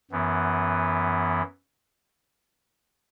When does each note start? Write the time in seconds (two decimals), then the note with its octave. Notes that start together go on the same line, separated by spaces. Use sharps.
0.11 F#2 E3 B3